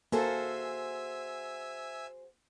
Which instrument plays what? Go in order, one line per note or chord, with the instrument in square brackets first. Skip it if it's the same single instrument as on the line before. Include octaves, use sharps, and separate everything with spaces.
[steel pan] A#3 A4 [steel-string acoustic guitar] F#4 G#4 C5 [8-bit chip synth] E5 G#5 E6